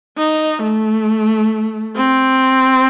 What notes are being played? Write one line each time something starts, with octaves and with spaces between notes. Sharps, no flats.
D#4
A3
C4